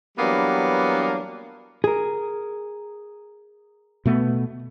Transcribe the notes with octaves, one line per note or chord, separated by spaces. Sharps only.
E3 F#3 G3 A#3 B3 D4
G#4 A#4
B2 A3 B3